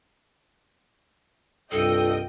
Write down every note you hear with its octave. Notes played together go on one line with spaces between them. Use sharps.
C2 G2 F4 A4 D#5 G5